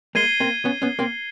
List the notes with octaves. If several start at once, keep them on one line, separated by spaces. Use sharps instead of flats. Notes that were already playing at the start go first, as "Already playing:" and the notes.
G#3 A#3 G#6 C7 D#7 G7
A#3 C4
B3 C#4
B3 C#4
A#3 C4